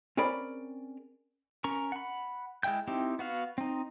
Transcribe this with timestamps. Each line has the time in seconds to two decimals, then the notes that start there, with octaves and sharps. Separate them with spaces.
0.17 C4 C#4 G#4 A#4 D5 B5
1.64 C#4 A#4 A#5 C#6
1.92 F#5 B5
2.63 G#3 E4 E5 G5 G6
2.87 C4 D#4 E4 G4
3.19 B3 F#4 F5
3.58 C4 D#4